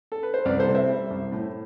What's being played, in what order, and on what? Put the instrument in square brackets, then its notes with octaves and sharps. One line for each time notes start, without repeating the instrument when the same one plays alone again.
[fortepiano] A4
B4
C5
C2 B4 D5
A4 C5
C3
C5 E5
G3
C2
A2